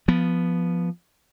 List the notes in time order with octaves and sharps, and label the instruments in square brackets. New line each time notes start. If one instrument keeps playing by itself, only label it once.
[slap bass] F3 B3